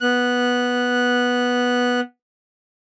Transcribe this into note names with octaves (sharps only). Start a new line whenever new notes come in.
B3 F#6